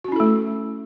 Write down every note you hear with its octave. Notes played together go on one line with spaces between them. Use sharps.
A3 C#4 E4 F#4 A4